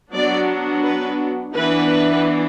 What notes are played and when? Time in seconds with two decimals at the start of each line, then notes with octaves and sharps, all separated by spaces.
0.13 F#3 B3 D4 D5
0.84 B4
1.54 E3 B3 D4 B4